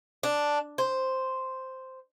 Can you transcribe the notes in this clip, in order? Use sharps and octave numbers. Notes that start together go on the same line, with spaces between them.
D4
C5